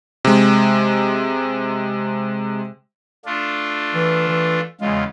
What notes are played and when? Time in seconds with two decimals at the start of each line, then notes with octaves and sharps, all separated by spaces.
0.25 C3 G#3
3.25 A3 D4 F4
3.94 E3
4.28 E3
4.81 E2 C#3 G#3 F4